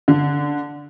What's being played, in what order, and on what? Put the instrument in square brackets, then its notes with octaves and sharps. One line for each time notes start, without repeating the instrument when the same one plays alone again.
[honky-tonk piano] D3